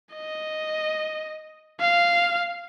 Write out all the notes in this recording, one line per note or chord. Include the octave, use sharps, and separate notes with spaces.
D#5
F5